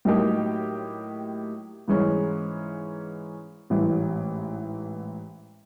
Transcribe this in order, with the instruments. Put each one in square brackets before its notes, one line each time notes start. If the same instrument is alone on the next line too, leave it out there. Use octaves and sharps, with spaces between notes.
[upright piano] A2 F#3 A#3 D#4 G4
G#2 E3 G#3 C#4
A1 G#2 E3